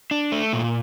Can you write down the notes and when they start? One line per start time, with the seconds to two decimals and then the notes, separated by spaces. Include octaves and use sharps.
0.11 D4
0.32 A3
0.53 A#2